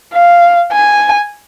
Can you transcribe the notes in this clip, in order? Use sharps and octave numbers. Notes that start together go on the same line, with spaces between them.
F5
G#5